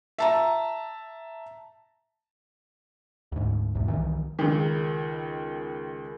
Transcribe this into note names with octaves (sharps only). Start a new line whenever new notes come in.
E5 A5 A#5
D2 G#2
B1 E2 G#2
C2 D#3 E3
C#2 D#3